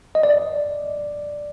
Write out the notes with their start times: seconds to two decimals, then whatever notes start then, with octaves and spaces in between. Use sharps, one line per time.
0.15 D#5
0.23 D5